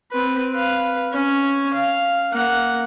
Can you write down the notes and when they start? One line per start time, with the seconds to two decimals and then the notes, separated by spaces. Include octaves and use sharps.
0.12 C4 B4
0.53 B4 F5
1.12 C#4 C#5
1.73 F5
2.33 A#3 F#5